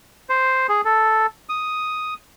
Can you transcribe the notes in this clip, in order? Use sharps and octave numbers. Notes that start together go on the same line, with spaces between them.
C5
G#4
A4
D#6